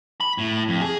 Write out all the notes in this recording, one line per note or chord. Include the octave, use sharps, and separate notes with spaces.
B5
A2
F2
G#4